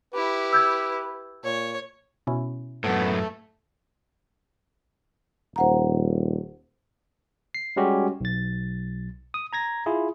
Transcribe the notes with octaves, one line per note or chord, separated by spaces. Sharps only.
E4 G4 B4
E6 G6 G#6
A#2 C#5
B2 C#4 E4
F#2 A2 A3 B3
D#1 C5 F#5 A#5
C7
G3 G#3 C#4 F#4 G4
B1 A6
D#6
A#5 G#6 A#6
E4 F4 G#4